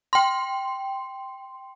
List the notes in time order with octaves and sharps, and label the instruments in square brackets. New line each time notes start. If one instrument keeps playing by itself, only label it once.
[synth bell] G5 C6